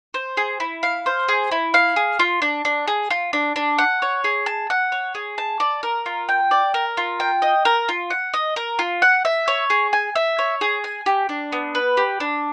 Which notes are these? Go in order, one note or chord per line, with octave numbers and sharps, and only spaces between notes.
C5
G#4
E4
F5
C5
G#4
E4
F5
G#4
F4
D4
D4
G#4
F4
D4
D4
F#5
C#5
G#4
A5
F#5
C#5
G#4
A5
D5
A#4
F4
G5
D5
A#4
F4
G5
D#5
A#4
F4
F#5
D#5
A#4
F4
F#5
E5
C#5
G#4
G#5
E5
C#5
G#4
G#5
G4
D4
B3
B4
G4
D4